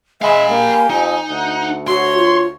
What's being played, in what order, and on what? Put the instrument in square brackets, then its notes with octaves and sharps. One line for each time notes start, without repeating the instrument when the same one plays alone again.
[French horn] G#3 [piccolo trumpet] E5 [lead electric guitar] F5 B5 [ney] G#5
[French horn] A#3 [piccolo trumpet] G4
[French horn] F2 [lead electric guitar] D#4
[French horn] D2 [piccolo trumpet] F#5
[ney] F#4 [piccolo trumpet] C#5 [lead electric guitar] C6
[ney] F4